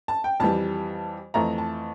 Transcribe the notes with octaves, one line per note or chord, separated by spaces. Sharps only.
A5
G5
F2 E3 G3 A5
F2 E3 A3 A#5
A5